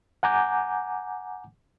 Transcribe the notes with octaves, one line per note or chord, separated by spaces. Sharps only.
F#5 G#5 A#5 D6 G6